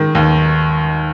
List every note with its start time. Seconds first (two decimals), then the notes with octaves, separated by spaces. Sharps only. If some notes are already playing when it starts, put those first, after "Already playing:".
Already playing: D#3 G#3
0.15 D#2